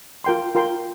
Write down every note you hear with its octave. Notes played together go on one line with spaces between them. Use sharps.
F4 A#4 G5 C6
F4 A#4 G5 C6